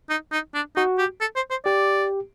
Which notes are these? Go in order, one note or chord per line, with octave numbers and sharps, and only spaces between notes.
D#4
D#4
D4
D#4 F#4
G4
A4
C5
C5
G4 D5